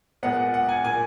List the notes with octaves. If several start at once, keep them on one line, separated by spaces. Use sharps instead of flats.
A#2 G#3 B3 F#5
F#5
G#5
A#2 A#3 G#5